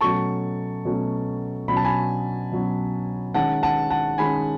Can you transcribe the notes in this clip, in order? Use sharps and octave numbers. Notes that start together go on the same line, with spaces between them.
B2 F#3 A3 C#4 A5 C#6
B2 F#3 A3 C#4
B2 F#3 C#4 B5
A5
G#5 B5
B2 F#3 C#4
D#3 G#3 C#4 F#5 A5
F#5 A5
F#5 A5
D#3 G#3 C#4 G#5 B5